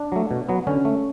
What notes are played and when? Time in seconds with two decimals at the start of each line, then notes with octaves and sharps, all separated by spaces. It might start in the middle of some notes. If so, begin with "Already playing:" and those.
Already playing: D4
0.12 F#3 A3
0.31 B2
0.49 F#3 B3
0.67 D3 C#4
0.85 A3